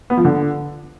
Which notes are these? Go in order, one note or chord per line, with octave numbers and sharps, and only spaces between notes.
B3
F3
D3